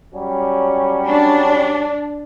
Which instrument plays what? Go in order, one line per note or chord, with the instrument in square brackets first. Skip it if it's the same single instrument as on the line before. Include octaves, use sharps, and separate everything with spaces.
[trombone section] F#3 G3 C#4
[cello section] D4